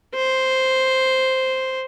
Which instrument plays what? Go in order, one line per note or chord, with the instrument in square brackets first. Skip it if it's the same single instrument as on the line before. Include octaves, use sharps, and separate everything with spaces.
[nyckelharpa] C5